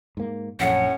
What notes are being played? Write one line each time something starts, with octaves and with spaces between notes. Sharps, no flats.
G#2 A#3
A#1 F#2 A2 C#4 F#5